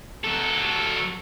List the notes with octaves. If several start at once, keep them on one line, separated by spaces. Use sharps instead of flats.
F#3 A4